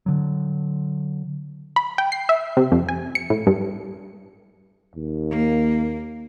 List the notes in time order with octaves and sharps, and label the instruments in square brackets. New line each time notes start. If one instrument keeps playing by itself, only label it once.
[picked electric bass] D3 F#3
[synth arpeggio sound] B5
G5
C7
E5
C3
F2
G#5
C#7
A2
G2
[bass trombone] D#2
[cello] A#3